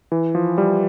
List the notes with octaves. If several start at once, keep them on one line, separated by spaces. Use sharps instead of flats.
E3
F3
G3